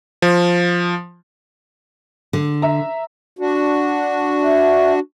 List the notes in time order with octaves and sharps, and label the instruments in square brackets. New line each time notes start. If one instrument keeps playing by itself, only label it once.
[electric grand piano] F3
[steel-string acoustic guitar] D3
[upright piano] E5 A#5
[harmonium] D4 F#4
[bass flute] E5